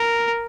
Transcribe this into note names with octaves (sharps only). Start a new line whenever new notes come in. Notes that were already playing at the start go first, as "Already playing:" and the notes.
Already playing: A#4